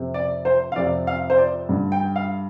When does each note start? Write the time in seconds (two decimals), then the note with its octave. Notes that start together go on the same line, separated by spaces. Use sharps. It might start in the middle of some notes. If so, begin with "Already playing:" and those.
Already playing: F2 C3
0.14 D5
0.45 C5
0.72 F5
0.76 F2 C3 D5
1.07 F5
1.30 C5
1.38 D5
1.69 G2 D3
1.92 G5
2.16 F5